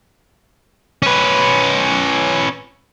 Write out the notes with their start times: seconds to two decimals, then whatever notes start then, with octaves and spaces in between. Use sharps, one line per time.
1.03 C#4 B4